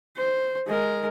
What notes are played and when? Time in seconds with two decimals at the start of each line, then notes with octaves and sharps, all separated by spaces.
0.17 C5
0.67 G#3 A#4